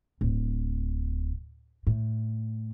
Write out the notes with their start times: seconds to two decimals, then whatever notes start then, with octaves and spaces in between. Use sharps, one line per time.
0.21 D1
1.87 A2